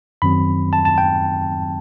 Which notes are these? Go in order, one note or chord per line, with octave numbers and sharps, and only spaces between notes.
F#2 D#3 F#3 C4 B5
A5
A5
G5